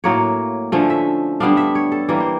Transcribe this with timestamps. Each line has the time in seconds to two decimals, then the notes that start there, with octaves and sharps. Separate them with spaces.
0.04 A2 F#3 A#3 C#5
0.72 D3 F3 A3 C#4
0.90 E5
1.40 D3 G3 B3 D4 F5
1.57 E5
1.75 C#5
1.92 A4
2.09 E3 G3 A#3
2.20 C5